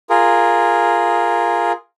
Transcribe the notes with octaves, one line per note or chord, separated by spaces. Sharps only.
F4 G#4 A#4